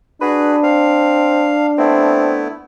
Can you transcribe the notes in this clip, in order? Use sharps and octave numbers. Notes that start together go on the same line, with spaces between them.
D4 F#4 G#4 B4
C4 F5
A3 B3 C4 E4